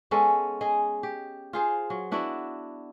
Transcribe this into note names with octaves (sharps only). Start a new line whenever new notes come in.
G#3 B3 C#4 A4
G#4 D#5
G4
F4 G#4 C5
F#3
B3 D4 E4 F#4